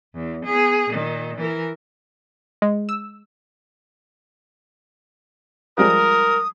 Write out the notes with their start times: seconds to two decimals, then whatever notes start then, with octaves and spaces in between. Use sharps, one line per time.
0.15 E2
0.45 B3 G#4
0.89 A#2 D#3
1.37 E3 A#4
2.62 G#3
2.89 E6
5.78 F3 G3 G#3 A#4 D#6